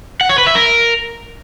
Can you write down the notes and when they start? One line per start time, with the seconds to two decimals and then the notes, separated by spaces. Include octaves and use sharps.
0.21 F#5
0.29 C#5
0.38 B4
0.47 E5
0.55 A#4